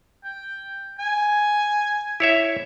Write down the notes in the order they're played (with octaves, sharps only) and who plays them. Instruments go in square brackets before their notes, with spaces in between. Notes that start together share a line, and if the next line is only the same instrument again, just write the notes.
[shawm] G5
G#5
[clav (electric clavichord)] E4 C#5 E5